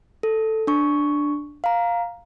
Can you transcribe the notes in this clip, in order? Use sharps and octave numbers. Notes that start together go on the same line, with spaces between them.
A4
D4 C#6
F5 A#5